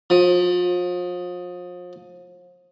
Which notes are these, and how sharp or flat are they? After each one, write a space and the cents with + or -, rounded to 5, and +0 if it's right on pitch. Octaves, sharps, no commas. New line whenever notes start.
F3 +35